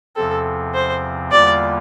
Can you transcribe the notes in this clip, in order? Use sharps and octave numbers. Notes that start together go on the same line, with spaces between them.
E2 C3 F3 C4 A4
C5
E2 D3 G3 A#3 F4 D5